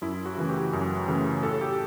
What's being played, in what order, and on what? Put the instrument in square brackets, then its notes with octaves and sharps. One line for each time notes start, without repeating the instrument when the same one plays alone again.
[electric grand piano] F#2 E4
F#4
C#3 E3 A3
G4
F#2
C#3 E3 A3
A2 A4
G4